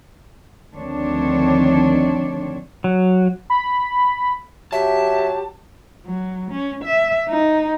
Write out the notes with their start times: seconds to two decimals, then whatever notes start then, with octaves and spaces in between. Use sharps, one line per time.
0.74 D2 D#3 F3 C4 D4 C#5
2.84 F#3
3.50 B5
4.72 F#3 G4 E5 A5
6.06 F#3
6.51 C#4
6.84 E5
7.29 D#4